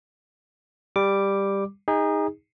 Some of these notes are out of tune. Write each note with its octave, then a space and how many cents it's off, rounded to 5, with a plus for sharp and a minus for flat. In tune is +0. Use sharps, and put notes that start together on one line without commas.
G3 +10 D6 +0
D#4 +10 G#4 -30